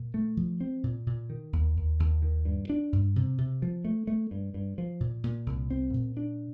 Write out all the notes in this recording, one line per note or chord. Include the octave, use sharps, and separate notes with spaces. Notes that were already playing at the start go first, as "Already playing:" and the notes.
Already playing: A#2
A3
F3
C4
A#2
A#2
D#3
D#2
D#2
D#2
D#3
G2
D4
G2
C3
C3
F3
A3
A3
G2
G2
F3
A#2
A#2
C2
C4
A#2
D4